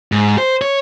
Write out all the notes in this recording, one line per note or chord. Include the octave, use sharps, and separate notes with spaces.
G#2
C5
C#5